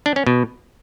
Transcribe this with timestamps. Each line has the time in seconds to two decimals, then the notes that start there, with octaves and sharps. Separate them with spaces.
0.06 D4
0.16 C#4
0.27 B2